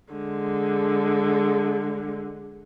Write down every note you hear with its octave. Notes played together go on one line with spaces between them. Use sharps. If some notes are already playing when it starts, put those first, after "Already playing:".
D3 G#3